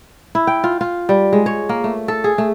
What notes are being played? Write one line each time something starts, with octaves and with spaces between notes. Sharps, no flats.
E4
G5
F4
F4
G3
G#3
C#5
A#3
A3
A4
G#4
A3